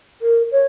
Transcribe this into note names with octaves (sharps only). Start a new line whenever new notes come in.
A#4
C#5